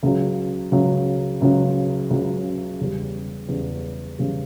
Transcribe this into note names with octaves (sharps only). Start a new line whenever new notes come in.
C#2 C#3 F#3
C#2 C#3 F#3
C#2 C#3 F#3
C#2 C#3 F#3
E2 C#3 G3
E2 C#3 G3
E2 C#3 G3